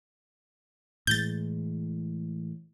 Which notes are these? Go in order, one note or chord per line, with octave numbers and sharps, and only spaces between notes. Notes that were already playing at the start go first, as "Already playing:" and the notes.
A2 E3 G#3 G6 A6